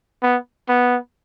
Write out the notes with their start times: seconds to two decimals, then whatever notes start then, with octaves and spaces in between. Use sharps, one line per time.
0.22 B3
0.69 B3